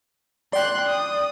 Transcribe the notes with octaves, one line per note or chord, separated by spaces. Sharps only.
D5 G5 C6 F#6
D#6